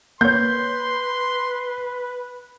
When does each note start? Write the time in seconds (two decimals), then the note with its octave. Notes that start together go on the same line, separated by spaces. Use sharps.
0.21 A#3 B4 C#5 C6 G6